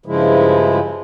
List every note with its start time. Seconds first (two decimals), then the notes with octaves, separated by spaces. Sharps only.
0.06 G2 C#3 F3 G#3 E4